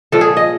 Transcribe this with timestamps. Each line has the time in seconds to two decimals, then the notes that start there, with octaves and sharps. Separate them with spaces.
0.12 A#2 F3 A4
0.21 G#4
0.37 D#5